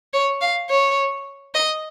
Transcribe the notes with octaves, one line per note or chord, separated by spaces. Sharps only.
C#5
F5
C#5
D#5